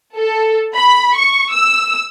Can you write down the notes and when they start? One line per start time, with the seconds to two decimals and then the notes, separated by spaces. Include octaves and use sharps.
0.16 A4
0.75 B5
1.16 C#6
1.53 E6